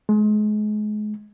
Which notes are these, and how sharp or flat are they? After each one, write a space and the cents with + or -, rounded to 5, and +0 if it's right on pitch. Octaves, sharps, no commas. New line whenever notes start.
G#3 +30